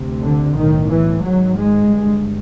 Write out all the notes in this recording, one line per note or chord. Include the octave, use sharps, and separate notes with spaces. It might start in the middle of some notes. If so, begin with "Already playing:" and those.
Already playing: D2 C3
D3
B1 A2 D#3
E3
G#1 G#2 F#3
G#3
G1 G2